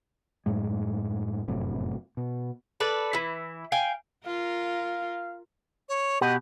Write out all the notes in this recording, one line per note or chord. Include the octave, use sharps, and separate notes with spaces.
F#2 A2 G#3
F1 F#2 A2 C3
B2
A4 B4 D5
E3 E4
F5 G5 G#5
F4 A#4 F5
C#5
B2 G4 D#5 F#5